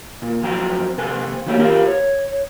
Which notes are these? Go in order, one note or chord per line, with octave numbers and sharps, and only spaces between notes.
A#2
F2 F#3 G5 A#5
C3 A4 B4 G#5
D#3 F#3 A3 A#3 G4 C#5
F4 G4 A#4 F5 A#5
C#5